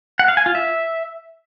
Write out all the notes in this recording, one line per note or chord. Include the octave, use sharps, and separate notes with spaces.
F#5
F5
G#5
F4
E5